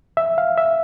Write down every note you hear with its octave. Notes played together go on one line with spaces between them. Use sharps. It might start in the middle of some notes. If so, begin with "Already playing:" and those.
E5
F5
E5